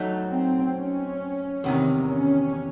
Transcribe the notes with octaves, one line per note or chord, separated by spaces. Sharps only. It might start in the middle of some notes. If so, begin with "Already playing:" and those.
Already playing: F#3 A3 D#4
C4
C#4
E2 C3 D#3
C#4